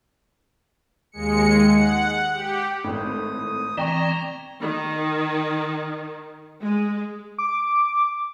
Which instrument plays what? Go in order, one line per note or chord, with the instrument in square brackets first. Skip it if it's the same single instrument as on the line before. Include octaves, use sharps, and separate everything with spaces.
[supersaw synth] D#2 G#3 C#7
F#5
G4
[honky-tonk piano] G#1 A2 [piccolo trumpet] D#6
[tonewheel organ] E3 C4 [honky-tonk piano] D5 G5 C#6 [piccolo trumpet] A#5
[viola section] D#3
G#3
[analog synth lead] D6